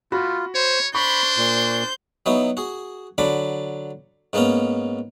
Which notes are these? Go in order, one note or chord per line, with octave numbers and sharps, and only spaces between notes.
A3 F4 F#4 B5
C5 C#5
D4 C5 B5 C#6 G6
A#2
F#3 B3 D#4 E4 F#4
F#4 G#4
D3 F#3 D4 B5 D6
G#2 A#3 B3 C#4 A#5